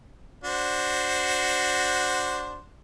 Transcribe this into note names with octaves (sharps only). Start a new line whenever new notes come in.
D4 F#4 C5